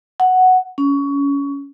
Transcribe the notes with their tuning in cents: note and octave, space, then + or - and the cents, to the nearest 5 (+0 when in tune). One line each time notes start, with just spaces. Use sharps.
F#5 +0
C#4 +20